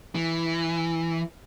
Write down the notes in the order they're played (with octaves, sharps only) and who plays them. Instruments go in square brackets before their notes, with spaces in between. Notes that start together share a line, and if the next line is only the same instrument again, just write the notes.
[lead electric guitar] E3